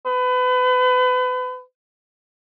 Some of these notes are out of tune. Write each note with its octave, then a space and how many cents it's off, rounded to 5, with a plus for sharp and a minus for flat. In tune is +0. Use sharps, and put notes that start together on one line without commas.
B4 +30